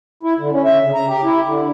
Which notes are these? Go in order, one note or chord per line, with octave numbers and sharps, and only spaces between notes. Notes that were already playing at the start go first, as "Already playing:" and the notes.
E4
D3
C#4
E5
C#3
A#5
G4
E4
D3